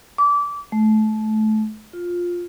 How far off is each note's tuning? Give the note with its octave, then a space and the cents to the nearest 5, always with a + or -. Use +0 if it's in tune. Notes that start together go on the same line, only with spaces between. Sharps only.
D6 -25
A3 -25
F4 +10